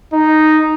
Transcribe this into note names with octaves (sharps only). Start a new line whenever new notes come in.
D#4